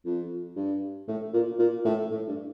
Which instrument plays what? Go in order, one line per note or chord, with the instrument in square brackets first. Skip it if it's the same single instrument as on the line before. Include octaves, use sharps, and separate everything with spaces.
[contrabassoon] F2
G2
A2
A#2
A#2
A2
A2
G2